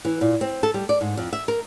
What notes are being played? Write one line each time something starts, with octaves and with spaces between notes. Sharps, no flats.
E3
A#2
C4
A4
G3
D5
G#2
F2
E5
A#4